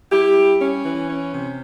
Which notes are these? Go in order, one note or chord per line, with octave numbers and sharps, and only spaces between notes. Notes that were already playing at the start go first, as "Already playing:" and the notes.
G3 E4 G4
G3
C#4
E3
C#4
C3